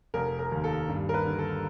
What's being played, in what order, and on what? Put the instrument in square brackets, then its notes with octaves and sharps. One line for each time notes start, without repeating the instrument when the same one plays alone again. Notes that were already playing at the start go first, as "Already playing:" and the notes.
[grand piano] F1 A#4
A#4
D#2
A4
G2
A#4
B4
D3
A4